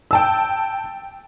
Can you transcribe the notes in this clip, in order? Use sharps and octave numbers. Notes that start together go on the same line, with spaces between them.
G5 A5 E6